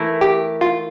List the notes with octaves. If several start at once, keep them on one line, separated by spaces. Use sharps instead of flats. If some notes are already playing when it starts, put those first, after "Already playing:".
Already playing: E3 A3 E4 A#4
G4
F4